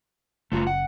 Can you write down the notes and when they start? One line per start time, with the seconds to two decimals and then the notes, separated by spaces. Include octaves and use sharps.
0.52 F#1 C#3 A3 F4 F#4
0.67 F#5